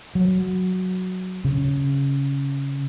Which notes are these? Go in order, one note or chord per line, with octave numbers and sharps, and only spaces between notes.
F#3
C#3